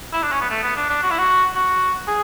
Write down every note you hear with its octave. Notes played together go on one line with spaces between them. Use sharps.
E4
D4
C#4
B3
A3
B3
D4
D4
F#4
E4
F#4
F#4
G#4